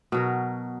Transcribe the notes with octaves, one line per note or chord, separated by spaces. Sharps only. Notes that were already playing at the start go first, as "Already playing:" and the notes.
B2 F#3 A#4